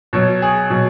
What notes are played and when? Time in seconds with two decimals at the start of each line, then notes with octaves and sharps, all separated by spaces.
0.13 B2 F#3 C#5
0.42 G#4
0.70 B2 F#3